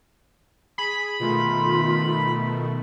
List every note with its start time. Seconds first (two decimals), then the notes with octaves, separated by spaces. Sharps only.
0.78 G#4 B5
1.20 B2 D#3 A3 F4